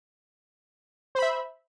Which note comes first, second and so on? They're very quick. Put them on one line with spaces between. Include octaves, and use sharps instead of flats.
C5 B5 E5